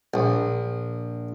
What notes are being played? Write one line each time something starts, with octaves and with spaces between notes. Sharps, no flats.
A#1